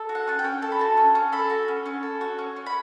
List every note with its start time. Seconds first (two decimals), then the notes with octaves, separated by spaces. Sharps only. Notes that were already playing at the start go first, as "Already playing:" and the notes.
Already playing: A4
0.09 F#4
0.15 F#5
0.27 C#4 A5
0.39 G5
0.44 C#4
0.62 A4 A5
0.72 B5
0.79 F#4 A5
0.97 C#4
1.15 C#4
1.32 A4 B5
1.50 F#4
1.68 C#4
1.86 C#4
2.03 A4
2.21 F#4
2.39 C#4
2.56 C#4
2.66 B5